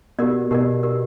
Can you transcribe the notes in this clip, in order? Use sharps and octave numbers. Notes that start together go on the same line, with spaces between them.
B2 G4 A#4 D5
B2 G4 A#4 D5
G4 A#4 D5